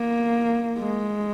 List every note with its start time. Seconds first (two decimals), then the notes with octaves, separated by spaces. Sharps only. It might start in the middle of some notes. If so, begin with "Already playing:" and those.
Already playing: A#3
0.79 G#3